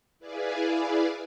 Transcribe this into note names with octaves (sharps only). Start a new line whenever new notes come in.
E4 G#4 B4 D5 F5 G#5